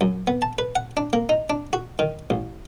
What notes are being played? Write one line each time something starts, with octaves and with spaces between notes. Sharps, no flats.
F#2
B3
A5
B4
F#5
D4
A#3
D#4
D4
F#4
D#3
A1